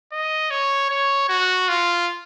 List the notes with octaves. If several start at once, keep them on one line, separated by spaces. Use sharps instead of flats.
D#5
C#5
C#5
F#4
F4